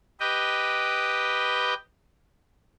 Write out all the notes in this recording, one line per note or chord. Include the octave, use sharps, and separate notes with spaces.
G4 B4 D#5 G5